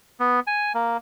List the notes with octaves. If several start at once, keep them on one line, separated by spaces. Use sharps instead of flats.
B3
G#5
A#3